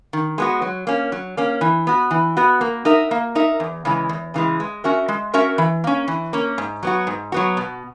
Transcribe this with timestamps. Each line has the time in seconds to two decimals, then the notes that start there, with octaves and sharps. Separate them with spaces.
0.13 D#3
0.38 G#3 B3 F#4
0.62 F#3
0.87 A#3 C#4
1.12 F#3
1.37 A#3 C#4
1.61 E3
1.87 B3 F#4
2.11 E3
2.37 B3 F#4
2.61 A#3
2.85 D#4 A#4 E5
3.11 A#3
3.35 D#4 A#4 E5
3.60 E2
3.85 C#3 E3 G#3
4.09 E2
4.34 C#3 E3 G#3
4.60 G#3
4.84 C#4 F#4 A#4 E5
5.08 G#3
5.34 C#4 F#4 A#4 E5
5.58 E3
5.84 A#3 C#4
6.08 E3
6.33 A#3 C#4
6.58 G#2
6.83 F#3 B3 F#4
7.07 G#2
7.32 F#3 B3 F#4
7.57 B2